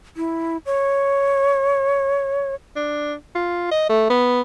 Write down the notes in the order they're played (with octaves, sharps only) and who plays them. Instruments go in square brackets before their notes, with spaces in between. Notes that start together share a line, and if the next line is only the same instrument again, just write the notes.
[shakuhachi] E4
C#5
[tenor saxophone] D4
F4
D#5
A3
B3